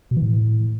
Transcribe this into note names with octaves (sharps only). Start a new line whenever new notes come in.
B2
E3
A2